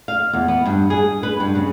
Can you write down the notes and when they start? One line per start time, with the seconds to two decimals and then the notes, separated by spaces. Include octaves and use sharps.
0.08 F5
0.33 E2
0.48 B3
0.66 G2
0.90 G#4
1.23 B4
1.40 G2
1.55 C#3